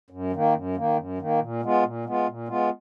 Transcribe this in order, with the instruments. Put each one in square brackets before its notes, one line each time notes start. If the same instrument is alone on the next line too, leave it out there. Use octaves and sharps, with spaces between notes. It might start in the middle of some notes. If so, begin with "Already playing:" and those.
[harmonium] F#2
D#3 A#3
F#2
D#3 A#3
F#2
D#3 A#3
A#2
G#3 B3 F4
A#2
G#3 B3 F4
A#2
G#3 B3 F4